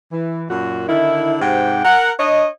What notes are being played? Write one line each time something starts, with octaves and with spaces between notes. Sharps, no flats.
E3
F#2 A#2 F#4
D3 D#3 E4
G#2 C3 G4 F#5 G5
A#4 F#5
D4 C#5 D#5